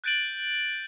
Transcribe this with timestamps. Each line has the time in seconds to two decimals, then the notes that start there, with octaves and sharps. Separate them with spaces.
0.04 F#6 G6 A6 D7 D#7 F#7